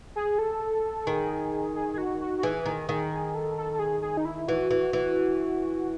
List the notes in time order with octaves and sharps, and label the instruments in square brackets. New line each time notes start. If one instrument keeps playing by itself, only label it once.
[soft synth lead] G#4
A4
[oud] D#3 [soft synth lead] G#4
[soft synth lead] G#4
G#4
F#4
F#4
F#4
[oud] E3 [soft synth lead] G#4
[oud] D#3
D#3
[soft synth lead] G#4
A4
A4
A4
G#4
G#4
D#4
E4
[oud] E3 [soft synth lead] F#4
[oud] E3
E3